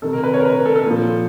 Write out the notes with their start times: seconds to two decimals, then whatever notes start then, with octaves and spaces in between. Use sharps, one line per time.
0.02 C3 D#3 A4
0.13 A#4
0.23 B4
0.34 C#5
0.40 A#4
0.45 B4
0.56 A#4
0.66 A4
0.76 A4
0.86 A#2 F3